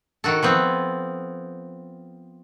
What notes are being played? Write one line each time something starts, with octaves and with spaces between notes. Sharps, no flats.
D#3 F#4 A4
F3 B3 C4